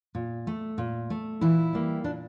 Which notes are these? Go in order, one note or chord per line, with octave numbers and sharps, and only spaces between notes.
A#2
A3
A#2
A3
A#2 E3 E4
G3 A#3
A#2 D4